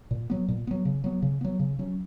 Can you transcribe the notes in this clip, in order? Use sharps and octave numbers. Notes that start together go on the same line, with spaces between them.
A#2
F#3 B3
A#2
F#3 B3
C#3
F#3 B3
C#3
F#3 B3
C#3
F#3 C#4